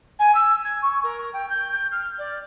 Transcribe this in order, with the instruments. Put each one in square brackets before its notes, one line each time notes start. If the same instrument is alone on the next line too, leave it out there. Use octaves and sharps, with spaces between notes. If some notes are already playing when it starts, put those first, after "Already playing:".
[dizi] G#5
E6
G#6
C#6
A#4
G5
G6
G6
F6
D5